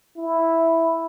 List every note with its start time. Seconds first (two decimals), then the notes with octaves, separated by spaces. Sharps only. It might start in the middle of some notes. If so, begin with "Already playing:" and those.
0.17 E4